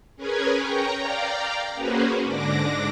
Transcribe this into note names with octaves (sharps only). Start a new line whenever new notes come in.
C#4 G#4 A#4 B4 G#5
C#5 G5 A#5
D5 F5 G5 A#5
A#3 C#4 F#4 G#4 B4 C5
G#2 D3 D4 D6 A#6